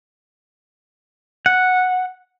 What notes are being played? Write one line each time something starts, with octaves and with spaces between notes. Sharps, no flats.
F#5